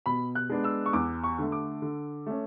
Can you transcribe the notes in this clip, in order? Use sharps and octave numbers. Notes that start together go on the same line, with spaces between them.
B2 B5
F#6
G#3 B3 D4
E6
C#6
E2 D6
C#6
D3 A3
D6
D3
A3 C#4